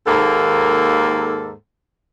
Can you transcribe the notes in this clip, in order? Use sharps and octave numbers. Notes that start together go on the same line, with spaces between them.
D#2 G#2 A#3 A4